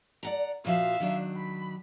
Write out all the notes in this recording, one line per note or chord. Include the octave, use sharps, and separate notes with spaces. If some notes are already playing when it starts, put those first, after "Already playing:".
D5 F#5 A#5
A#2 F3 F#4 E5 F5
D#3 F#3 D4
B5